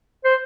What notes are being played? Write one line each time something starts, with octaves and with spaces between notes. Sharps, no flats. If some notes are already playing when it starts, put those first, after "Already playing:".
C5